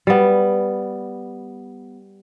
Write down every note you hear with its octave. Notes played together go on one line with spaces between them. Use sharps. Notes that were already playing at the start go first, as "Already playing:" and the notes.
G3 B3